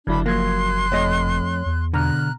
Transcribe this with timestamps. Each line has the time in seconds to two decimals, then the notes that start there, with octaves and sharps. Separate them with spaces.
0.07 F#1 D3 F#3 D4 E4 B5
0.26 F3 F#3 A#3 C6 F#6 G#6
0.92 F2 A3 C#5 D#5
1.66 E2
1.94 B2 D3 A#5 F6 F#6